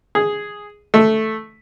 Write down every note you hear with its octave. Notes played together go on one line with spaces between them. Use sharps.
G#4
A3